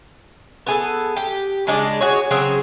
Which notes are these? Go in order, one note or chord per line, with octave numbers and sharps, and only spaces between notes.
B3 G#4 A4
G4
C#3 G#3 D4 D5
F#4 G#4 C#5
C#3 F#3 C4 G#4